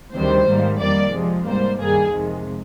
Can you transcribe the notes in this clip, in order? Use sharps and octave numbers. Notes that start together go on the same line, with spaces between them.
D2 C3 D#3 G3 C5
G#2 D#3 G3 A#3
F2 D#3 G3 A#3 D5
F2 C3 F3 G#3
G#2 G3 A#3 C5
G2 D#3 G3 A#3 G#4
F2 C3 D#3 G#3